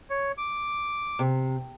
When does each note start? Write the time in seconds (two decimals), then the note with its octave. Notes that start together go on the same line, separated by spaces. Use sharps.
0.10 C#5
0.38 D6
1.19 C3